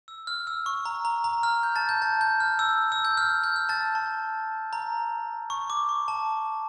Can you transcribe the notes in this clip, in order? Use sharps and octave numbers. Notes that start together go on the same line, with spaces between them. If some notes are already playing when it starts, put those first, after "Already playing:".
E6
F6
E6
C#6
A#5
A#5
A#5
F6
G6
A5 A6
G6
A5 A6
G6
F6
E6
E6
G6
F6
G6
F6
A5 A6
A5
A#5
C#6
D6
C#6
A5